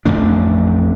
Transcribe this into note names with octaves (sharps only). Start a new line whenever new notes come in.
A1 F2 A3 D4